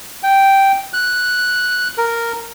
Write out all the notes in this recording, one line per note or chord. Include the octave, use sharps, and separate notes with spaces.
G5
F#6
A#4